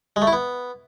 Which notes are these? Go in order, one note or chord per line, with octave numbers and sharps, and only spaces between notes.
G#3
A3
E4
B3